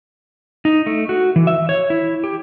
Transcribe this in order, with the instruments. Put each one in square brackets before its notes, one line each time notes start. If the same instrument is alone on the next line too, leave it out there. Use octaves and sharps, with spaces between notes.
[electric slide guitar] D#4
A3
F#4
E3
E5
C#5
E4
G4